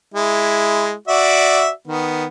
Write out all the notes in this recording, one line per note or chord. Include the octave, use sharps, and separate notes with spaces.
G#3 E4
F#4 D5 E5
D#3 B3